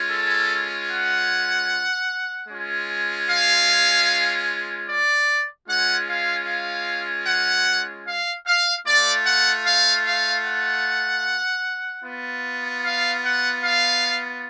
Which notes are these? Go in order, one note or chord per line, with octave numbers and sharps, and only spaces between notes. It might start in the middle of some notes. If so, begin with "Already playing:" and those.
Already playing: G#3 C#4 F4
A4
F#5
G#3 C#4 F4
F5
D5
G#3 C#4 F4 F#5
F5
F5
F#5
F5
F5
A3 F4 D5
F#5
F5
F5
F#5
B3 F4
F5
F#5
F5